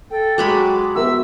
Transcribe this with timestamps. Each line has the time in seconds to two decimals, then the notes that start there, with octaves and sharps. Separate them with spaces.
0.11 A4 G5
0.38 F#3 G#3 B5 D6
0.95 B3 F#4 A#4 E5 E6